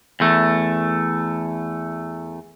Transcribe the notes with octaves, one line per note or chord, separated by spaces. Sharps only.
E2 A3